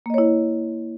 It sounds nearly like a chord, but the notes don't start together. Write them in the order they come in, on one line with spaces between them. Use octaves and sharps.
A#3 D#5 C#5 E4